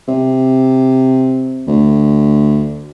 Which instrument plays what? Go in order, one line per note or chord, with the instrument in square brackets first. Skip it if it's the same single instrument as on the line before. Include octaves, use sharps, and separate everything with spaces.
[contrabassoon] C3
D2